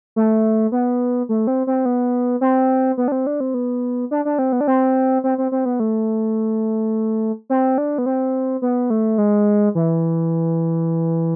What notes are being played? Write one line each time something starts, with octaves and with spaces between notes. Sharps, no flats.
A3
B3
A3
C4
C4
B3
C4
B3
D4
C4
D4
C4
B3
D4
D4
C4
B3
D4
C4
C4
C4
C4
B3
A3
C4
D4
B3
C4
B3
A3
G#3
E3